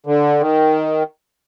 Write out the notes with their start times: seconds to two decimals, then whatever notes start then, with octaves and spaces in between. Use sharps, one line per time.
0.06 D3
0.40 D#3